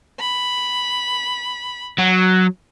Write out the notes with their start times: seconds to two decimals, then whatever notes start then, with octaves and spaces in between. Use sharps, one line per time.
0.20 B5
1.98 F#3